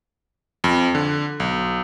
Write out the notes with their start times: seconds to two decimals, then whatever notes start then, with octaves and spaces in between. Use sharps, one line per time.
0.64 F2
0.95 D3
1.40 B1